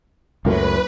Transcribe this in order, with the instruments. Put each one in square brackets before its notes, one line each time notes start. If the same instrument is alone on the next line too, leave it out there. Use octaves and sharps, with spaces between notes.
[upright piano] F#1 A#4 [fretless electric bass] C#2 F#3 A3 [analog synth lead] F#2 [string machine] B4